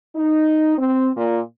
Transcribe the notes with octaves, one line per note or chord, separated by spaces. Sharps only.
D#4
C4
A#2